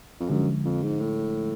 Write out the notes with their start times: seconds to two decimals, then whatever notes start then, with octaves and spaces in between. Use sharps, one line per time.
0.20 F2
0.30 F#2 D3 F3 G#3
0.65 F2
0.83 G#2
1.00 A2